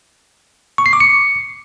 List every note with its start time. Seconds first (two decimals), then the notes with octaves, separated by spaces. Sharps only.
0.78 C#6
0.86 C7
0.93 D6
1.00 C#7